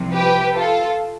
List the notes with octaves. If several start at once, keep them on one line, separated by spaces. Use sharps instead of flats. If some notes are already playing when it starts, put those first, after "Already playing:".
Already playing: C2 C3 F3
G4 B4
F4 A4